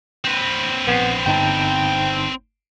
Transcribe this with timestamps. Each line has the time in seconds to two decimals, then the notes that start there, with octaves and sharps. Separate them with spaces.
0.25 C4 B4
0.87 A#1 B3 C7
1.26 G1 D#4 G5 A5